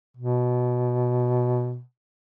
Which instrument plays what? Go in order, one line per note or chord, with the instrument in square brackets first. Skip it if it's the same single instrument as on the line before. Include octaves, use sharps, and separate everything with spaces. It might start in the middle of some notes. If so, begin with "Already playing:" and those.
[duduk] B2